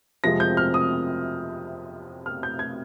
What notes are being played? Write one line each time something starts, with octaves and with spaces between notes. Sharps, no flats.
F2 C3 F3 G#3 A#6
G6
F6
D#6
F6
G6
G#6